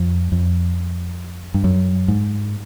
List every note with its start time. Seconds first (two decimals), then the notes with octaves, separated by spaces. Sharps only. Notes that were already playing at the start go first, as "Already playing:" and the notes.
Already playing: F2
0.32 F2
1.54 G2
1.64 F#2
2.08 G#2